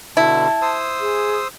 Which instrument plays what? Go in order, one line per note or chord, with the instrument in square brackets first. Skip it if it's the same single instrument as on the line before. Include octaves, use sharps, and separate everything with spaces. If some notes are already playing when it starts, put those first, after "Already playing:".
[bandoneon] B2 D3 [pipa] E4 [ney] A5
[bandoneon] C5 D#6 E6
[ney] G#4